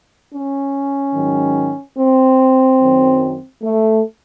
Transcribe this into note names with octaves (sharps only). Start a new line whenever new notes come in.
C#4
G#2 D#3 F#3
C4
F#2 D#3 F#3
A3